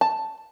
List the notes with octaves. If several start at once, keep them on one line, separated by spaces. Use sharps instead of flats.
A5